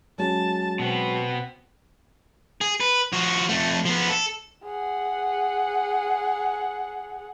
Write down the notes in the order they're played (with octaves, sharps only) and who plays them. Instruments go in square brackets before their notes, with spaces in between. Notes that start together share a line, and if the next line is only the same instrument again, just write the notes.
[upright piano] F#3 G#3 C#4 [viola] A5
[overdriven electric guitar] B2 B3 [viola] C4
[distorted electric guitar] G#4
B4
F3 F#4
F2 A3
F3 B3
A4
[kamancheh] G#4 F#5